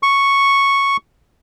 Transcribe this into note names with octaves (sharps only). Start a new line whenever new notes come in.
C#6